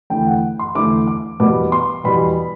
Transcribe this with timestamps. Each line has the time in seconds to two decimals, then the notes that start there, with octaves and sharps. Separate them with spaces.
0.10 E2 D3 A3 E4 G5
0.27 F#5
0.59 C6
0.75 E2 D3 A3 E4 D6
1.07 D6
1.40 E2 B2 G3 B3 D6
1.72 C6
2.04 E2 B2 G3 B3 B5